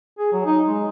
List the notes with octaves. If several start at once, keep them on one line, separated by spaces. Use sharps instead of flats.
G#4
F#3
D#4
G#3